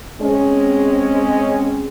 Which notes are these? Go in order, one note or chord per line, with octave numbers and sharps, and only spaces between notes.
G#3 C4 C#4